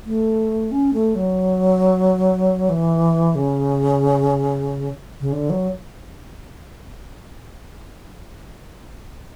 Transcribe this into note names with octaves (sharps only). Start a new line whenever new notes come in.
A3
C#4
A3
F#3
E3
C#3
C#3
D3
F#3